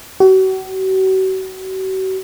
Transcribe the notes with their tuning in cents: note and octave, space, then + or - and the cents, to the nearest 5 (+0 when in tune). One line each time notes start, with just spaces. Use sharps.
F#4 +35